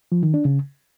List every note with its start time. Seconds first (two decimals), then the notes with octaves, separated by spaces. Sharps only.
0.12 F3
0.23 D#3
0.34 D4
0.45 C#3